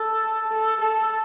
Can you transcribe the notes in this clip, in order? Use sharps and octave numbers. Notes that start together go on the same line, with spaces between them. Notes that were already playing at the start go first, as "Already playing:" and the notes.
Already playing: A4
A4
A4